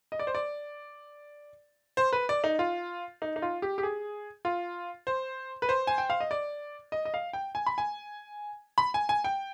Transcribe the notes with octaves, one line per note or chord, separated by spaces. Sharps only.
D#5
D5
C5
D5
C5
B4
D5
D#4
F4
D#4
D#4
F4
G4
G4
G#4
F4
C5
B4
C5
G#5
G5
F5
D#5
D5
D#5
D#5
F5
G5
G#5
B5
G#5
B5
G#5
G#5
G5